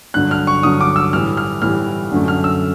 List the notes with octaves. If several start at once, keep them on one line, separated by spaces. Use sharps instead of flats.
G2 D3 F#3 F#6
F6
C#6
G2 D3 F#3 D#6
D6
E6
A2 E3 G3 F6
F6
A2 E3 G3 F6
F#2 D3 F#3 A3
F6
E6